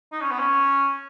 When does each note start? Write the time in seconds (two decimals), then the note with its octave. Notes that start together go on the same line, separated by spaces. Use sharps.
0.12 D#4
0.21 C#4
0.31 B3
0.39 C#4